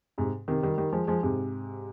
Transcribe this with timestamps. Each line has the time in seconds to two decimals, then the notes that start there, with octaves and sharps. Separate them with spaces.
0.18 G#2 C3
0.48 C3 D#3
0.62 D#3 G3
0.77 D#3 G3
0.93 F3 G#3
1.07 F3 G#3
1.23 G#2 C3